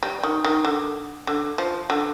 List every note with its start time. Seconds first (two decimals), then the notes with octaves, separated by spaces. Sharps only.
0.03 G3
0.23 D#3
0.44 D#3
0.65 D3
1.27 D3
1.58 F3
1.90 D3